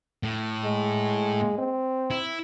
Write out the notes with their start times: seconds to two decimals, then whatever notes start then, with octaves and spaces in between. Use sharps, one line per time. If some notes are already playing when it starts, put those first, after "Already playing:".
0.23 A2
0.64 G#3
1.58 C4
2.11 E4